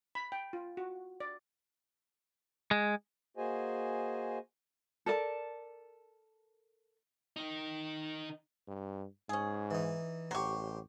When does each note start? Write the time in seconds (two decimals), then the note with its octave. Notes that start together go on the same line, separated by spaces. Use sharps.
0.15 B5
0.32 G5
0.53 F4
0.77 F#4
1.20 D5
2.71 G#3
3.37 A#3 F#4 G#4 C5 D#5 G#5
5.06 A4 A#4 D5 A5
7.36 D#3 D#4
8.68 G2
9.29 G#2 C#4 G#4
9.71 E3 D#4
10.31 A1 F#3 G4 C5 C#6